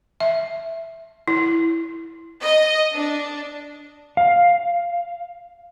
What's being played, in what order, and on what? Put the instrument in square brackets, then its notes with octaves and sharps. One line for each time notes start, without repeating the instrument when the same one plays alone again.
[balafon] E5
E4
[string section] D#5
D4
[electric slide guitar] F5